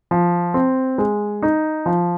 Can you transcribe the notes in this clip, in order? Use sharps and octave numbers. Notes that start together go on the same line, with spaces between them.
F3
C4
G#3
D#4
F3